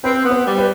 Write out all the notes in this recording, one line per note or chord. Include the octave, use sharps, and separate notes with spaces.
C4 B4
B3
B4
G3
B4